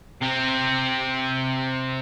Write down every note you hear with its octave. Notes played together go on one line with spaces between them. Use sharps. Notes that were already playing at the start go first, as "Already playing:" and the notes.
C3 C4